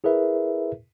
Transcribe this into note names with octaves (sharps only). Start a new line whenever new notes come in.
E4 G#4 A#4 B4 E5